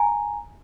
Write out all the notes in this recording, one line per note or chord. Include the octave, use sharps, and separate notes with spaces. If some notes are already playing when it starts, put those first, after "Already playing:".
Already playing: G#5 A#5